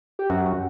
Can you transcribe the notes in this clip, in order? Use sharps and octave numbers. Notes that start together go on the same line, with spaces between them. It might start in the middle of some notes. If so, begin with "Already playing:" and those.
G4
F#2 F#4
F#4